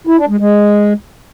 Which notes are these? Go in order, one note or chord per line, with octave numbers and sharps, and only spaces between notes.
E4
D4
G#3
G#3